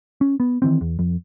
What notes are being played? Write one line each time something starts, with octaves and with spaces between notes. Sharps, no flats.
C#4
B3
D#3 E3 C4
E2
F2